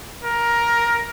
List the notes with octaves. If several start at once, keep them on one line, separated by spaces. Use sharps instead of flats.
A#4